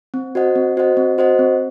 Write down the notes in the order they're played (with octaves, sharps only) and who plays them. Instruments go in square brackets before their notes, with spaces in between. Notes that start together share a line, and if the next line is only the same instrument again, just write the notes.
[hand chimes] C4
F#4 C5 D#5 F#5
C4
F#4 C5 D#5 F#5
C4
F#4 C5 D#5 F#5
C4